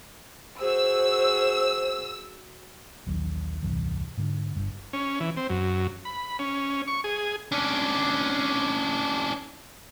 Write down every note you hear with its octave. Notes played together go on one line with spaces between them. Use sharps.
F#4 G#4 C5 E6
A#1 D#2 F#3
D#1 C2 G2 E3
G#2 D3
G1 G2
C#4
E3
C4
F#2
B5
C#4
C#6
G#4
C#4 D4